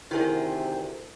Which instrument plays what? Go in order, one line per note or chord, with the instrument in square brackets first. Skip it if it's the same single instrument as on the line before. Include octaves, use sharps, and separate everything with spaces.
[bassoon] D2 [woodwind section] C3 [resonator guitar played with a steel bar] D#3 G#4 [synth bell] E4 A#4 D5